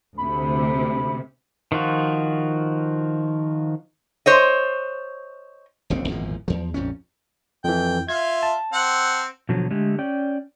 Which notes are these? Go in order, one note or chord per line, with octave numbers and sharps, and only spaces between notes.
D2 C3 B5
D#3 F3 F4 F#4
C5 C#5 D#5
E1 A#1 C#3 C4
G#1 E2 A#2 F3
E2 F3
A#1 F2 G#2 C#4
F2 E3 G5
F4 E5 G#6
A5
C4 F#5
B2 D3 F3 F#3
D3 G#3 A3 G4
C#4 D5 G5